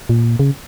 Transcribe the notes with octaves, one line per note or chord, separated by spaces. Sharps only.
A#2
C#3